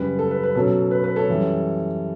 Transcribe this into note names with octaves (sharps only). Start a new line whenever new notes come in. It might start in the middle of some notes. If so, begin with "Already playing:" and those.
Already playing: F#2 C#3 G3 B4
A4
B4
B4
B2 F#3 C#4 A4
B4
B4
A4 C#5
F#2 E3 G3